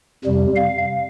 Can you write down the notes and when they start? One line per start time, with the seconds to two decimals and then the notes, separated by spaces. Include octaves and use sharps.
0.25 F2 C3 G3
0.56 F5